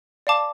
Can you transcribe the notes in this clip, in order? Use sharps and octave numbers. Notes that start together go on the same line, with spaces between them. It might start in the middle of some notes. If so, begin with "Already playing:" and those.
D5 F5 A5 D6